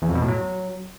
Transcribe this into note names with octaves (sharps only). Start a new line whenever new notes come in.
E2
F2
B2
A2
F#3